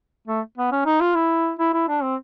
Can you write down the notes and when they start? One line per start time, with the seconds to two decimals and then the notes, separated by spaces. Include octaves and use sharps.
0.27 A3
0.58 B3
0.72 C#4
0.86 D#4
1.01 F4
1.15 E4
1.59 E4
1.73 E4
1.88 D4
2.03 C4